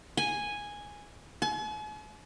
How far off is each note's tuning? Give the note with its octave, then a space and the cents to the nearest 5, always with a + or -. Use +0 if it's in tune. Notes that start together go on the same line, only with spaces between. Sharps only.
G#5 -5
G#5 +45